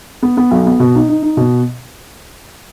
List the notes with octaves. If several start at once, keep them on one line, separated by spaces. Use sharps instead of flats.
B3
B3
B1
B3
B2
D#4
D#4
D#4
B2